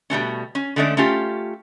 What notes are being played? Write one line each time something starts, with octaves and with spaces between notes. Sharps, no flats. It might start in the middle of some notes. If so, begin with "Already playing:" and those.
B2 G3 A3 C#4
C#4
D3 G#3 A3 C#4 D5
A3 C#4 F4 G4